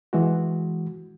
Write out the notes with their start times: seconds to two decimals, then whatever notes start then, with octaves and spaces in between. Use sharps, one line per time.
0.13 E3 G#3 F#4